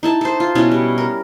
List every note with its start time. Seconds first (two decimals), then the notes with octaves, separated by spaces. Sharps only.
0.03 D#4 E4 A5
0.21 A4 C5
0.40 F4
0.55 B2 B3 C#4 E4
0.71 G3
0.98 A#4